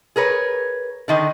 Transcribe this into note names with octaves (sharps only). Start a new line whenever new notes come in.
G#4 A#4 B4 C#5
D3 D#3 D#4